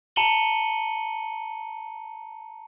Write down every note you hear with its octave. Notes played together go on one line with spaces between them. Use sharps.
A5 A#5 C#7 D#7 F#7 G7